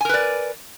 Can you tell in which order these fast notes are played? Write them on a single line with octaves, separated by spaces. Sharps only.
G#5 A#4 B4 D5